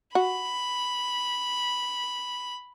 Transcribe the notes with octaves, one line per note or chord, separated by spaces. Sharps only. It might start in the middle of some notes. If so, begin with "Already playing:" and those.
F#4 B5